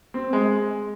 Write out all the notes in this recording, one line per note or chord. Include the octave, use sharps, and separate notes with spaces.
C4
G#3